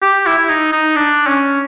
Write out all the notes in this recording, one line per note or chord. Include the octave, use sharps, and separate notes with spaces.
G4
E4
E4
D#4
D#4
D4
C#4